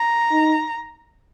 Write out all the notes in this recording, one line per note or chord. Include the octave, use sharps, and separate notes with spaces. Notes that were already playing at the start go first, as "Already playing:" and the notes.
Already playing: A#5
D#4